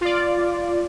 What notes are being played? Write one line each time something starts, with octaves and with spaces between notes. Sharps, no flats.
F4 D5